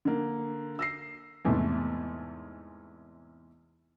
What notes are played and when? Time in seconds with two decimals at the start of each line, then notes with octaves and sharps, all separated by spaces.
0.05 D3 A#3
0.79 E6 A#6 C7
1.45 E2 G#2 C3 A3